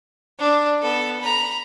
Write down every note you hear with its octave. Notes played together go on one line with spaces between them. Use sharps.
D4
B3 A4
A#5 B5